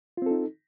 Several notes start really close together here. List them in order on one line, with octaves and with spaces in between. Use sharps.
F4 C4 A4 D#4